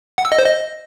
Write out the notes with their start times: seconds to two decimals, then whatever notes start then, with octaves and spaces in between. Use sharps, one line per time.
0.18 F#5
0.25 E6
0.32 D#5
0.39 C5
0.45 D#5